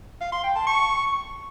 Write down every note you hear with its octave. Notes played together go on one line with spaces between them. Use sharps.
F5
C6
G5
A5
C#6